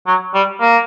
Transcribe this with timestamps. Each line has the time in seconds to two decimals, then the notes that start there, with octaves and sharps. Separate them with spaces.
0.07 F#3
0.34 G3
0.61 A#3